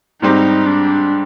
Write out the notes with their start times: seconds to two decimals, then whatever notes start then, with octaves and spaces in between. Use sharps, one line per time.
0.21 G#2 G3 C4 D#4 G4
0.66 D4